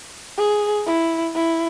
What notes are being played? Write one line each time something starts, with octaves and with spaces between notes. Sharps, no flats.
G#4
E4
E4